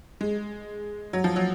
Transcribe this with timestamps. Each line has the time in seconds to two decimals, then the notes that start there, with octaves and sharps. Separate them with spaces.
0.21 G#3
1.13 F#3
1.24 F3
1.36 F#3